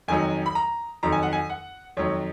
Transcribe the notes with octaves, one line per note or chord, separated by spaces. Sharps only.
F2 D#3 F#3 G#5
B5
A#5
F2 D#3 F#3 A#5
G#5
F#5
G#5
F#5
F2 D#3 F#3 C#5